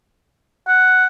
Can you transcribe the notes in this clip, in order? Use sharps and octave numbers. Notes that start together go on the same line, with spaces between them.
F#5